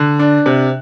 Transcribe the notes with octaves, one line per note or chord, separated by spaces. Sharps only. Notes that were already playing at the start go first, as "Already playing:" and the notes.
Already playing: D3 F#6
D4
C3